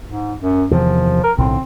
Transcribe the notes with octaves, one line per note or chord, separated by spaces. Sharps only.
G#2
F#2
E2 C3 D#3 F3
A#4
B1 A2 D3 C4